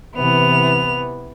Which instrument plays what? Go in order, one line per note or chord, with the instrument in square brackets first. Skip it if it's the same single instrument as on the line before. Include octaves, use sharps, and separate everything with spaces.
[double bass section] C3 E3 [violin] B3 F7